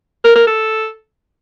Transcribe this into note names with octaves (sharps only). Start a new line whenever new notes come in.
A#4
A#4
A4